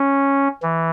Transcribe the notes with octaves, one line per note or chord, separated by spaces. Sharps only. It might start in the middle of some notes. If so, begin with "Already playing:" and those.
Already playing: C#4
E3